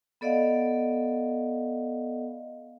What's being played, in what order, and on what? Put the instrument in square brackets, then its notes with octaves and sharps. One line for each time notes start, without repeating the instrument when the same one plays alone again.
[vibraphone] B3 A4 D5 D#5 F5 F#5